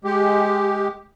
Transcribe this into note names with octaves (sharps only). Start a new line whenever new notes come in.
G#3 G4